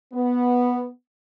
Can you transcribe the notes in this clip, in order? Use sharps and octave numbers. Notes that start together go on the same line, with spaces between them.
B3